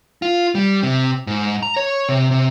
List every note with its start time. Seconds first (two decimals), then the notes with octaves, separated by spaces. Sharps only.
0.22 F4
0.55 G3
0.83 C3
1.27 G#2
1.63 A#5
1.76 C#5
2.09 C3
2.31 C3